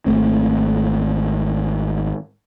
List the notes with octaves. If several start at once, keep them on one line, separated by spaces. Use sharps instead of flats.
G#1 F2 A3 C4